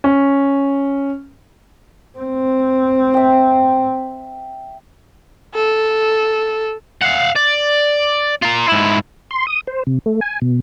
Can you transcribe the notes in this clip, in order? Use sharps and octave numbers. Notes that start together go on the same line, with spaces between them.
C#4
C4
E5 G5
A4
F5 F#5
D5
F4 A#4
G#2 E4
C6
D#6
C5
C3
A3
G#5
B2